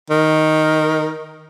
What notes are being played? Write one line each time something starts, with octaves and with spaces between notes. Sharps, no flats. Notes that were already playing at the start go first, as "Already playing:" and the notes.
D#3